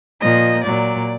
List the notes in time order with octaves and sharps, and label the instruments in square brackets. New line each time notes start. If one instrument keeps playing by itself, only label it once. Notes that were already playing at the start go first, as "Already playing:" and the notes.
[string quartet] A#2 F3 D#5
A#2 F#3 D5